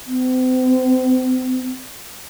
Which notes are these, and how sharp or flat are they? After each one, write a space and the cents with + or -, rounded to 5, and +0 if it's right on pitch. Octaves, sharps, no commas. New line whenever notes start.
C4 -40